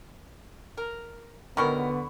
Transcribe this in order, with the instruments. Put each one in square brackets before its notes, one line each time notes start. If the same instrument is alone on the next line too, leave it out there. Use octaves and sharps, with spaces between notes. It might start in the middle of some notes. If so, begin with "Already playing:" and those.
[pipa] A#4
[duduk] D3 [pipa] D#3 F#3 A#4 [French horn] B3 [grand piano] B5 C#6